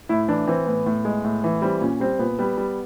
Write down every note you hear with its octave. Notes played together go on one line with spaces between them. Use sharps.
A2 E4
E3 D4
E3 C4
A2 B3
A2
G#3
A2
E3
G3 C4
A#2 C#4
G3 C4
A#2 B3
G3 B3
G3